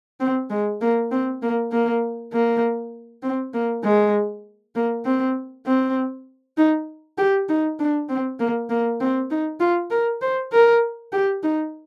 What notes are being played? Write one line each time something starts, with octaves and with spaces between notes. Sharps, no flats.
C4
G#3
A#3
C4
A#3
A#3
A#3
C4
A#3
G#3
A#3
C4
C4
D#4
G4
D#4
D4
C4
A#3
A#3
C4
D#4
F4
A#4
C5
A#4
G4
D#4